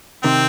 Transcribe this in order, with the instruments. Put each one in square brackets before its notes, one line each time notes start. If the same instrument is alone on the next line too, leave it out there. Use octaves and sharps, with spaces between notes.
[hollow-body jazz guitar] C3 D#3 [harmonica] C4